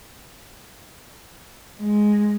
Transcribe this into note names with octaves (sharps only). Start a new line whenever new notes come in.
G#3